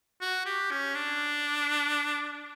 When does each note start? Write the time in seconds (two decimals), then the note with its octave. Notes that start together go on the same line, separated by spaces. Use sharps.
0.21 F#4
0.46 G4
0.71 C#4
0.95 D4